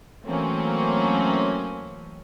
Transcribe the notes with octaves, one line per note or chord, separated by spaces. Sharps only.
E3 F#3 A3 A#3 C4 C#4